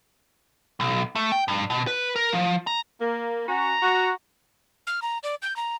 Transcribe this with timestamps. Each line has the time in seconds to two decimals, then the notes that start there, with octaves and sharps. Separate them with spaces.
0.80 B1
1.15 A3
1.32 G5
1.48 G2
1.70 B2
1.87 B4
2.16 A#4
2.33 F3
2.67 A#5
3.00 A#3
3.47 C#4 F#4 A#5
3.82 F#4
4.87 F6
5.02 A#5
5.23 D5
5.42 G6
5.56 A#5